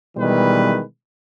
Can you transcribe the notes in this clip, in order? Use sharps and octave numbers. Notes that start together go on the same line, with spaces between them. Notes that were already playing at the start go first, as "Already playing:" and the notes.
B2 D#3 E3 G3 G#3 B4